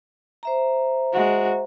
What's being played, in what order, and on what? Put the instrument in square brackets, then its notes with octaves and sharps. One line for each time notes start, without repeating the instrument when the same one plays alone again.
[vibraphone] C5 E5 A#5
[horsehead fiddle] G#3 F#4